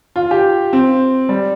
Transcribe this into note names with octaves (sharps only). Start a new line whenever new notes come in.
F4
G4
C4
G3